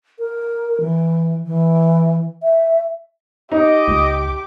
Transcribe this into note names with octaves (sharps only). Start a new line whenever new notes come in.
A#4
E3
E3
E5
D#4 G4 D#5 D6
C#2